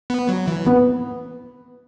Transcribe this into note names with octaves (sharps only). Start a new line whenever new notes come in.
B3
F#3
E3
B3